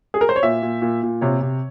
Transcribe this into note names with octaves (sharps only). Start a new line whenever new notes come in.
G#4
A#4
C5
C#5
A#2 E5
A#2
A#2
A#2
C3 C#5
C3